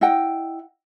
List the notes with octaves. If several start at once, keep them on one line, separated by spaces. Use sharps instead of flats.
E4 D#5 F#5 G5